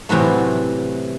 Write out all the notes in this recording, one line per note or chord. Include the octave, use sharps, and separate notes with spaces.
A2 C3 E3 F#3 A3